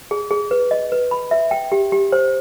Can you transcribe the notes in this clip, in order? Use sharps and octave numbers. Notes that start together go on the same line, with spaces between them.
G#4
G#4
B4
D#5
B4
B5
E5
G5
G4
G4
C5